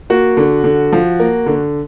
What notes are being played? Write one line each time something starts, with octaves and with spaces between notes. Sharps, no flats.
A#3 F#4
D3
D3
F3
A#3
D3